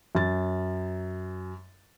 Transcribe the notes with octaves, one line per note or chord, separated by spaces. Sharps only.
F#2 A6